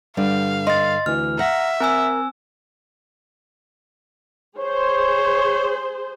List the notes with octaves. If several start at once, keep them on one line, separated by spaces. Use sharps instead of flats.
G2 D3 G3 F5
D#5 C6 A6
D2 E3 F6
E5 F#5 A#5 A#6
C4 A#4 G#5 E6
G#4 C5 C#5